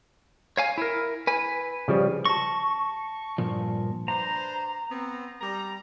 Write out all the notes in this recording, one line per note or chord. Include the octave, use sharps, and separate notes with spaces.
C#5 F5 G#5
E4 A#4
B4 G#5
C#3 F3 G3
A5 C#6 A#6
G2 A#2 F3
D4 B4 C5 A#5
B3 C4
G3 A#5